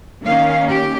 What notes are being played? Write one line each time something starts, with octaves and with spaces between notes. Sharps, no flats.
D#3 A#3 C#4 F5
G4